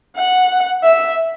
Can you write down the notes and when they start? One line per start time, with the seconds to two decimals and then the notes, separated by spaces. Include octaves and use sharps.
0.17 F#5
0.83 E5